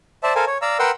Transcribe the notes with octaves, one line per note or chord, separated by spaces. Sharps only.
C5 D5 E5 A5
A4 A#4 C5 F5 G#5
C#5
D5 F5 A#5 E6
A#4 B4 F#5 G5 C6 E6